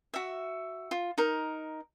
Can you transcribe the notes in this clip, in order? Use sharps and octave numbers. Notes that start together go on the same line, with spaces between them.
F#4 E5
F4
D#4 A#4